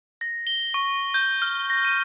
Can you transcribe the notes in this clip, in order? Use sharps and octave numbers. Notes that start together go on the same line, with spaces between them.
A#6
G7
C#6
G6
F6
A#6
D#7